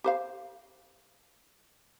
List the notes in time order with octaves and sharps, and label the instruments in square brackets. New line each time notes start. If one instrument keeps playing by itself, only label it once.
[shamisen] G4 C5 F5